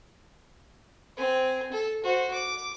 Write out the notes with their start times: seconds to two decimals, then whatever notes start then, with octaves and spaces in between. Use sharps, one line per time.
1.16 C4 G#5
1.72 A4
2.04 F#4 C5
2.34 D6